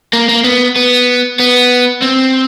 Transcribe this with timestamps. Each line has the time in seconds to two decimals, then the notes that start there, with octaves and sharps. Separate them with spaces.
0.13 A#3
0.28 A#3
0.44 B3
0.76 B3
1.39 B3
2.02 C4